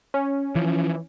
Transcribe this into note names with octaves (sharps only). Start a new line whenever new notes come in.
C#4
E3 F3